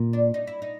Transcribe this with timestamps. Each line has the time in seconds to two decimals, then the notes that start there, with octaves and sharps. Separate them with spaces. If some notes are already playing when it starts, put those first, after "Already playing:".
Already playing: A#2
0.13 D4
0.34 D#4
0.47 E4
0.62 D#4